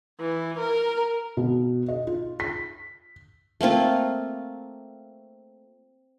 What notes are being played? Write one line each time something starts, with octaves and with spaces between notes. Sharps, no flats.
E3
A#4
B2
D#5
F4
B6
A3 A#3 C4 F4